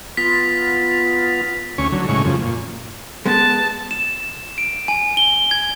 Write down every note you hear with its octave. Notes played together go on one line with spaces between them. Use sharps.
B3 F4 B6
D2 C#4 C#6
D3 F#3
A2 C#3 G#3 C#6
F#2 C#3 F3
A#2
G#3 B3 A5
E7
D7
G#5
G7
G#6